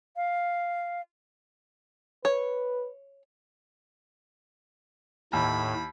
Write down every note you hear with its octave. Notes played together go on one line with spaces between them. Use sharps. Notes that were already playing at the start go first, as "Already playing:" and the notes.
F5
B4 C#5
D#2 A2 B5